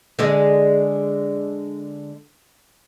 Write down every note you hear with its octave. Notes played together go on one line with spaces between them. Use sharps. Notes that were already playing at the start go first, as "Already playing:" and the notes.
D3 G#3 G#4